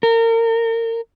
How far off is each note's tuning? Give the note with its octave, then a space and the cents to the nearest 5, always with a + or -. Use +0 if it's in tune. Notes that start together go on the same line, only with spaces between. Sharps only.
A#4 -30